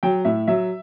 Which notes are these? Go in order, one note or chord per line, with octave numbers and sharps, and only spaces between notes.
F#3 G5
A2 E5
F#3 E5